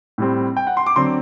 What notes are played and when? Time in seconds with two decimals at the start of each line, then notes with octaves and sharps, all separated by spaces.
0.18 A2 G3 C4
0.57 G5
0.67 F#5
0.77 C6
0.86 D6
0.96 D3 F#3 C4 C6